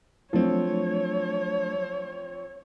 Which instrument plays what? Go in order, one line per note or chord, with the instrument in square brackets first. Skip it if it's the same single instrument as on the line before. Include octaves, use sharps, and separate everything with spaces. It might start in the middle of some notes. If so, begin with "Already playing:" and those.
[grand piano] F3 C4 [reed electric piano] F#3 A3 D4 [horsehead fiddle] C#5